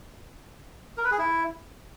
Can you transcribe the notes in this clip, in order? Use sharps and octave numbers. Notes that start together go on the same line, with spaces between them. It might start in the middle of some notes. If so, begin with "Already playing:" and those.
A#4
B4
G#4
E4